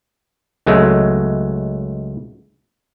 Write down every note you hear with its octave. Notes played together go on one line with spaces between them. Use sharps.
C#2 F#3 G#3 A3